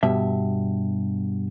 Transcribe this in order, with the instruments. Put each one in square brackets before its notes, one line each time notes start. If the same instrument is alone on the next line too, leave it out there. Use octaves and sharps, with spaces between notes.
[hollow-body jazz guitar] G2 B2 E5